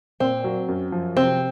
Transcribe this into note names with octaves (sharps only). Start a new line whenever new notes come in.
A#2 C4
F#3
F#2
F3
C3 C4